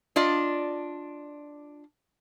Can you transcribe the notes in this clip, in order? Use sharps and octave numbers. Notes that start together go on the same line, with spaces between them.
D4 F4 D5 D#5